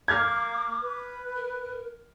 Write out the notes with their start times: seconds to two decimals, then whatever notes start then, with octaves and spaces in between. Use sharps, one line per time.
0.08 A#3 D6 F6 G#6
0.82 B4
1.36 A#4